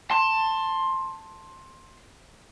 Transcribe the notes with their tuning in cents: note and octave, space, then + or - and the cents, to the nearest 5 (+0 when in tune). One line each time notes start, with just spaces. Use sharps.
A5 +10 C6 +15